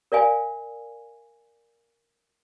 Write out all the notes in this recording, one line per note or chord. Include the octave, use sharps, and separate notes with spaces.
A#4 D5 F5 G#5